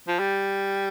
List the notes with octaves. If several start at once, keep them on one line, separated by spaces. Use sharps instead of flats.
F3
G3